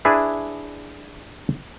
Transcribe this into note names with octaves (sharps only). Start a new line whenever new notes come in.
D4 E4 G#4 B4 E5